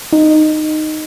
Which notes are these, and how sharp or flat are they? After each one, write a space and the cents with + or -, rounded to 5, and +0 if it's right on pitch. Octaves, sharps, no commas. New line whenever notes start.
D#4 -10